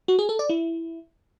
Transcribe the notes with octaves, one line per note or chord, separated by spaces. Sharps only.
F#4
G#4
A4
D5
E4